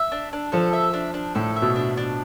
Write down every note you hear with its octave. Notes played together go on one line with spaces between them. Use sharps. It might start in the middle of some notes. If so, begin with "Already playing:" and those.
Already playing: E5
D4
D4
F3 A4
E5
D4
D4
A2 A4
E5
B2
D4
D4